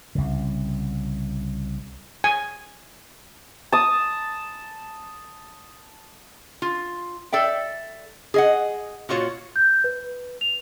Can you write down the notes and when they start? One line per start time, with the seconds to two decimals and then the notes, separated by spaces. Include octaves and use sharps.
0.15 C2 C#3
2.24 G#5
3.72 A5 D#6
6.62 F4
7.32 A4 D5 E5 G5
8.34 G#4 D#5 F#5
9.09 A#2 F4 F#4 C#5
9.56 G6
9.84 B4
10.41 F7